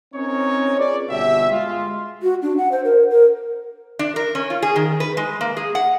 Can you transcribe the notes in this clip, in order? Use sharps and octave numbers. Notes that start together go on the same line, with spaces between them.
C4 C#4 D#4 A#4 C#5
F4 G#4 B4 D5
G1 B2 G4 E5
G#3 F4
F#4
D4
F#5
C5
A#4
A#4
D4
A#4
C#4
F4
G#4
D#3
B4
G#3
A#3
G#4
F#5